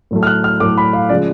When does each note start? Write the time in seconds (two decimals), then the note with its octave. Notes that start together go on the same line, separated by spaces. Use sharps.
0.11 A2 F#3 A3
0.23 F6
0.27 F#6
0.44 F6
0.60 A2 F#3 A3 D6
0.78 B5
0.93 F5
1.09 C#3 F3 G#3 D5